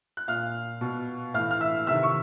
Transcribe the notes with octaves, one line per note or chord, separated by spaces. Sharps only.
F#6
A#2 F5 F6
B2
A2 E3 F5 F6
F6
E5 E6
C3 D#3 E5 E6
C#6